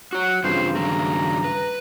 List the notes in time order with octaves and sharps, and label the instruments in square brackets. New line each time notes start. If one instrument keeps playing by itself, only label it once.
[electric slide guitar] F#4 C#5 [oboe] F#5
[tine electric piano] G2 C#3 [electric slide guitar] E3 C4 F4 [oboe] C5
[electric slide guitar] D#3 F#3 A3 [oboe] A#5
[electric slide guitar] B4